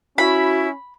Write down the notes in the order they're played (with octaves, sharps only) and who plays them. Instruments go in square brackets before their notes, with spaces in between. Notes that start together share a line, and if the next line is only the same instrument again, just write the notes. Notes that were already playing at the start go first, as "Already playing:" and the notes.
[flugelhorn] C#4 [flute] E4 [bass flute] F#4 [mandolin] B5